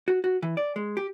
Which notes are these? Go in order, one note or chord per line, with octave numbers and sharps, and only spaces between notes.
F#4
F#4
E3
D5
G#3
G4